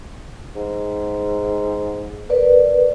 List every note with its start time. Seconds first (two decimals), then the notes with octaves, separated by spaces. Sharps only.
0.55 G#2
2.29 A#4 B4 D5